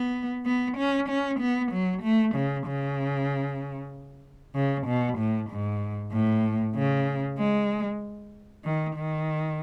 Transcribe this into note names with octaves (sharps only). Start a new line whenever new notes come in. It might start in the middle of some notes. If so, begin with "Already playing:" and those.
Already playing: B3
B3
C#4
C#4
B3
F#3
A3
C#3
C#3
C#3
B2
A2
G#2
A2
C#3
G#3
D#3
D#3